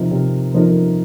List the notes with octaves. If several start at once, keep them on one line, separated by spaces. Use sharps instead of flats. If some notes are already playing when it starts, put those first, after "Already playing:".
Already playing: C3 F3 D#4 A#4
C3
F3 D#4 A#4